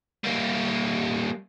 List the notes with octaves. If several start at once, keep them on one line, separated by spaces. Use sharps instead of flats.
G3 A#3